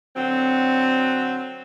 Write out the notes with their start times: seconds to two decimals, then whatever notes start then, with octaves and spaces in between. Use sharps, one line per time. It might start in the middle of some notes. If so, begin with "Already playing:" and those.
0.16 D3 F#3 C4